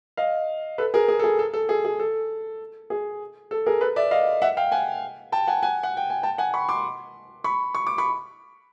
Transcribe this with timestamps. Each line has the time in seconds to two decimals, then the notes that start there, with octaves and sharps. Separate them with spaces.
0.17 D#5 F5
0.78 A4 B4
0.94 G#4 A#4
1.08 G#4
1.19 A4
1.24 G#4
1.39 A4
1.54 A4
1.69 G#4
1.85 G#4
2.00 A4
2.90 G#4
3.51 A4
3.66 G#4 A#4
3.81 A4 B4
3.96 D5 E5
4.11 D#5 F5
4.42 E5 F#5
4.57 F5 G5
4.72 F#5 G#5
5.32 G5 A5
5.47 F#5 G#5
5.63 F#5 G#5
5.83 F#5
5.97 G5
6.10 G#5
6.23 G5 A5
6.38 F#5 G#5
6.54 B5 C#6
6.69 C6 D6
7.44 B5 C#6
7.75 C#6
7.87 D6
7.98 B5 C#6